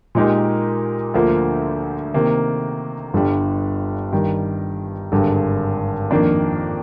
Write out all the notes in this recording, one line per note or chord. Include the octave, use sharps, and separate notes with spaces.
A#2 G#3 D#4 G4 A#4
D2 D3 F3 A#3
C3 D#3 A#3
G1 G2 D3 G3
G2 D#3 G3
G#1 G2 D3
F2 D#3 A#3 D4